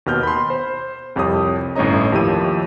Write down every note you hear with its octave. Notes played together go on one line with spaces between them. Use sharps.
D#2 B2 F6 G6
B5 C6
C5
C2 F2 G4 C#5 D#6
G1 A2 C#4 C#5 D#5 A#5
D#2 F3 E4 G4 E6 D#7